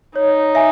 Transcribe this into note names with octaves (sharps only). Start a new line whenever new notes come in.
D#4 C#5
E5 G#5